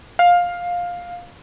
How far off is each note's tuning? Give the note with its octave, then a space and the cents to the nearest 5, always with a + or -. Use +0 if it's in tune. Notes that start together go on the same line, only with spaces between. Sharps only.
F5 +15